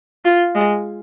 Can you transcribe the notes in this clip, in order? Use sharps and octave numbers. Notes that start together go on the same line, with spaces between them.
F4
G#3